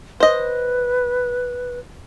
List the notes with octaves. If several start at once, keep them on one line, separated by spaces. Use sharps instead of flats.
B4 C5 D#5